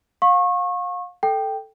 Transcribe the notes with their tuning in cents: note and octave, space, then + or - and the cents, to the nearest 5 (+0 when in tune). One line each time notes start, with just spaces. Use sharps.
F5 +35 C#6 -25
A4 +0 G5 +0